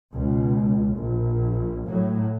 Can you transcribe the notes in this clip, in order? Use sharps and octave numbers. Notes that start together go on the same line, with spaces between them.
C#2 B2
A#1
A2 F#3